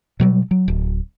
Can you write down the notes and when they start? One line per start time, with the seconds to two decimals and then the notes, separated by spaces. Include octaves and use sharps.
0.20 B2 F#3 G3
0.51 F#3
0.68 D1